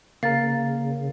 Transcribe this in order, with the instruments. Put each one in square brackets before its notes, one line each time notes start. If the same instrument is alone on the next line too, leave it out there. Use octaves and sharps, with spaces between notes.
[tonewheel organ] C#3 [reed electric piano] A#3 A#4 [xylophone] F5 A6